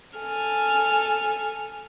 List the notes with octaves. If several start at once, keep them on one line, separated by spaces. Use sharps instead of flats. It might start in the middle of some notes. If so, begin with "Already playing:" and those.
A4 G#5 F6